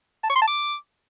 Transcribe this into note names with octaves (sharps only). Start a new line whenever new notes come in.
A5
C#6
C6
A5
D6